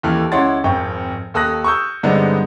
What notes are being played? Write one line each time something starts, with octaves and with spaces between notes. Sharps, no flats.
D#2 E3 A4 F6
C#2 E4 C#5 F#5 C6 A6
G#1 F2 G5 C#6
D#2 A4 D#6 F#6 A#6
C#6 D#6 E6 G6
G2 D3 G#3 B3 C4 D#4